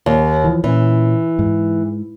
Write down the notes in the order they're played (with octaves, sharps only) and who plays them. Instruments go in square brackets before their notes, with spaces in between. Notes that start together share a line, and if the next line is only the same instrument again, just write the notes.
[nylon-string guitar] D#2
[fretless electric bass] E3 F3
[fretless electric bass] A#2 C#4 [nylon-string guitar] E3
[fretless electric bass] G#2